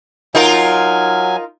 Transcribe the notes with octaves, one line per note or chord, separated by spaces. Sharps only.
F#3 D#4 F4 A#4 G#5